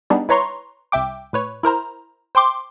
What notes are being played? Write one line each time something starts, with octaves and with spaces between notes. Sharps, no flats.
G3 B3 D4 D#4 G#4
E4 B4 C#5 A#5 C6 C#6
C2 E5 G5 D6
A2 B4 C#5
E4 A#4 C5 A#5
C5 G5 C6 D6